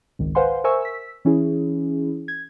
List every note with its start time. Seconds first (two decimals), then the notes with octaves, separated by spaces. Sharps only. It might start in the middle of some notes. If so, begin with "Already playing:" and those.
0.19 G#1 C#2 D#3
0.35 B4 C5 F5 F#5 G#5 C6
0.64 A#4 C5 E5 G#5 C#6 E6
0.82 E6 B6
1.25 E3 C#4 E4 G#4
2.28 G#6